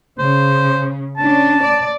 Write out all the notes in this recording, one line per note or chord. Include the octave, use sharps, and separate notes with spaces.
C#3 C5
C#4 D4 A5
D5